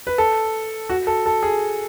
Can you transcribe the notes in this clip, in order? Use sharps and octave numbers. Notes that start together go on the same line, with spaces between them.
B4
A4
F#4
A4
A4
G#4